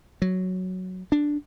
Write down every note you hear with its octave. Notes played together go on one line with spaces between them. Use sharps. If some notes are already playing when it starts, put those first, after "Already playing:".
F#3
D4